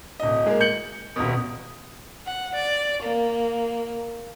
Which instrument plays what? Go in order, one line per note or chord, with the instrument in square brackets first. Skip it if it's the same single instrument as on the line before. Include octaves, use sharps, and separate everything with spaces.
[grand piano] D1 D#5
G#3 A#3
G6 C#7 F#7
D#1 B2
[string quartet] F#5
D5
A#3